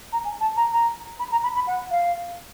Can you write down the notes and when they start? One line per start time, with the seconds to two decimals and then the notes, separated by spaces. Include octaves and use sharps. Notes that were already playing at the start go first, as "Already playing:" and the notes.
0.12 A#5
0.25 G#5
0.40 A5
0.56 A#5
0.72 A#5
1.19 B5
1.32 A#5
1.43 B5
1.55 B5
1.67 F#5
1.91 F5